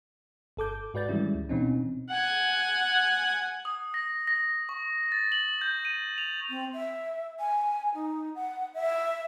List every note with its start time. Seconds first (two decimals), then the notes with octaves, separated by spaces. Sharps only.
0.57 G1 A4 D6 G6
0.94 G#2 F#4 B4 D5 G6 A6
1.09 D#3 E3 G3 G#3 C#4 E4
1.34 D2
1.49 B2 E3 C4 C#4 D#4
2.10 F#5 G#5
3.65 D#6
3.94 A#6
4.27 A#6
4.69 C#6
5.12 A6
5.32 F#7
5.61 G6
5.85 D#7
6.18 F7
6.49 C4
6.74 E5
7.40 G#5
7.94 D#4
8.35 F#5
8.74 E5